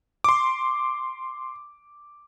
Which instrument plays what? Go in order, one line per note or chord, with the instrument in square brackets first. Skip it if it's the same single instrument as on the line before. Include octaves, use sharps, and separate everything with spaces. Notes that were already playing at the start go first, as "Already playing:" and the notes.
[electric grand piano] C6 D6